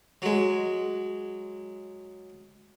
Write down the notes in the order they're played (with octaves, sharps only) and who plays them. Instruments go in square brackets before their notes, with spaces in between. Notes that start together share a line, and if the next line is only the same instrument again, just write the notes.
[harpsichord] F#3 G#3